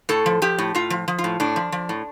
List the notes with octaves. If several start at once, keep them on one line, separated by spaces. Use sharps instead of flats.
A2 A4
F3
F3 G4
A2
A2 F4
F3
F3
F4
A2
A2 D4
F3
F3
A2